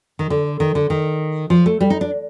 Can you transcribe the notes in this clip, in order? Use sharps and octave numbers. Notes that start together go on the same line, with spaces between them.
D#3
D3
D#3
D3
D#3
F3
A3
G3
D#4
D4